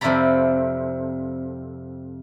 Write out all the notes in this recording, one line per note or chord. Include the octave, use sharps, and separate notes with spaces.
F2 C3 E4 D5 A#5 B5